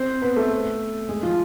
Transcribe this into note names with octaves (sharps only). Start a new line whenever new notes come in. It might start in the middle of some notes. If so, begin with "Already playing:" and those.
Already playing: C4 C5
B3 B4
A3 A4
G#3 G#4
F3 F4